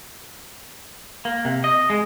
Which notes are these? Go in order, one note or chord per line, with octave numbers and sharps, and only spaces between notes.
A#3
C3
D#5
G#3